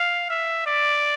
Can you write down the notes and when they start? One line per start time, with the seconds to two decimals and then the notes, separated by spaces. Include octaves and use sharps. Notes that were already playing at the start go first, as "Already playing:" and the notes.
Already playing: F5
0.30 E5
0.66 D5